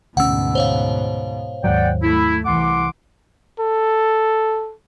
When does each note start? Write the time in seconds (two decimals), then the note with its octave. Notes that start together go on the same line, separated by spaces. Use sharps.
0.17 D2 G#2 B2 C#4 F#5 E6
0.55 C5 C#5 F5
1.64 D#2 G#2 F#3 D5 F#5 G5
2.03 A3 E4
2.46 C2 E3 F#5 C6 D6
3.60 A4